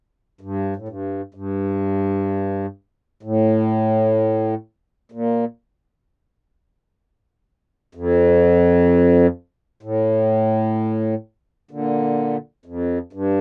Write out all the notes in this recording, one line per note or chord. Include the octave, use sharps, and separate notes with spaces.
G2
A2
G2
G2
A2
A#2
F2
A2
A#2 D3
F2
G2